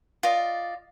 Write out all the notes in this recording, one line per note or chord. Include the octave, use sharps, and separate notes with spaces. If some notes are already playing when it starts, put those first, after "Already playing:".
F4 D5 D#5